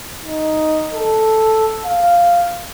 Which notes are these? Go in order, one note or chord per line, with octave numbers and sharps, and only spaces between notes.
D#4
A4
F5